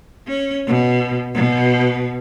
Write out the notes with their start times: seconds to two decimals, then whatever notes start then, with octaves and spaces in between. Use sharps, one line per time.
0.27 C#4
0.67 B2
1.34 B2